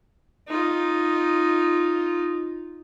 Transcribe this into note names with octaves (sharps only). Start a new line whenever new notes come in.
D#4 F4